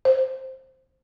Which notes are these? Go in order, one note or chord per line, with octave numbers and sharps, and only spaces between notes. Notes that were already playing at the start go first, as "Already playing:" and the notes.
C5